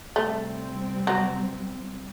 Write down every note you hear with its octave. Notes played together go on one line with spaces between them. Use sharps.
C3 G3 A3 C4
F#3